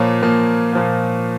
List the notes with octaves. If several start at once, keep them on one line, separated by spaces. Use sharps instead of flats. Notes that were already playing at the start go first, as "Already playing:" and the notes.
Already playing: A#2 F3 A#3 C#5
A#2 F3 A#3
A#2 F3 A#3